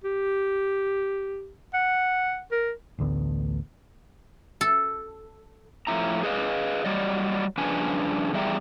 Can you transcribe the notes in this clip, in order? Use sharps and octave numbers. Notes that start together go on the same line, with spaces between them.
G4
F#5
A#4
A1 D2 D3 B3
A4
A2 F3 E4 A#5
G#4 B4 D#5 F5
F#3 G3 D5 D#5
G2 C#3 F3 D4 B4 G#5
E2 G3 G#4 E5 G5 A#5